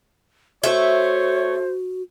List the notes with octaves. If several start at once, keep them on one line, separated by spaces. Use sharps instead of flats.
A3 F#4 C5 C#5 E5